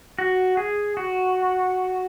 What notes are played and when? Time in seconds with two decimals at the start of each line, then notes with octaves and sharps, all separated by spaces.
0.18 F#4
0.57 G#4
0.97 F#4